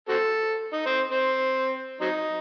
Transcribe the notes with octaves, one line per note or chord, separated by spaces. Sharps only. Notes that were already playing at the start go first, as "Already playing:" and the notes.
C4 F#4 A4
D#4
C4
C4
F#3 C4 D#4